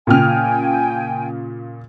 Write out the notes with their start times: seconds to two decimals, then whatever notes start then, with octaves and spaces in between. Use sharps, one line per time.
0.07 A#2 C#3 G5 G#5 F6